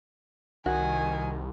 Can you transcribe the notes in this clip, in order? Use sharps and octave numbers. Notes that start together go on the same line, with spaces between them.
C2 D#3 F#4 G#5